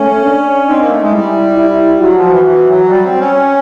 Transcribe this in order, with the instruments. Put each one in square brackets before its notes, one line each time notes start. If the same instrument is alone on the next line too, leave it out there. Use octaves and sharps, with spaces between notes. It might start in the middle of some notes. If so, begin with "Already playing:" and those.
Already playing: [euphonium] A3 [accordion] C#4
[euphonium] D4
[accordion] C4 [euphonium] D#4
[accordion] A#3
A3
G#3
[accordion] G3 [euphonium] E4
[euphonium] E4
[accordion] F#3 [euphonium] F#4
[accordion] F3
E3
E3
F#3
G3
C4
C#4